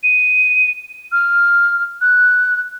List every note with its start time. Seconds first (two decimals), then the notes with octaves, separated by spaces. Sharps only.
0.03 D#7
1.12 F6
2.01 F#6